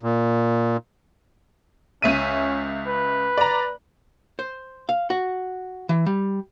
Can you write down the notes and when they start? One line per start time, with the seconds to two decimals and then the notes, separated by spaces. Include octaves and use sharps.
0.03 A#2
2.02 C#2 C#4 E5 D#7
2.87 B4
3.38 D5 A#5
4.39 C5
4.89 F5
5.10 F#4
5.89 E3
6.06 G3